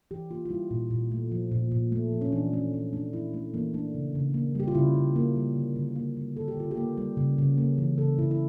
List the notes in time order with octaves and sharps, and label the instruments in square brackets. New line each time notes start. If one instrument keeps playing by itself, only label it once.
[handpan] E3 G4
A#3 F4
F4
G3 E4
A#2
A#2
A3
F3
A#2
A#2
A3
F3
C#4
E3 D4
A3 C#4
E3 C#4
A3 D4
E3 E4
A3 C#4
E3 A#3
A3 D4
C#3
C#3
A#3
G3 G4
F4
C#3 E4
C#3
A#3
G3
D3
D3
A#3
G3
D3 A4
G4
D3 F4
G4
A#3
G3
C#3
C#3
A#3
E3
C#3 A4
C#3 E4
E4